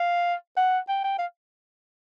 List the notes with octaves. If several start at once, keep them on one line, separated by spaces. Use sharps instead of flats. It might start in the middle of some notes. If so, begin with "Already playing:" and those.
Already playing: F5
F#5
G5
G5
F5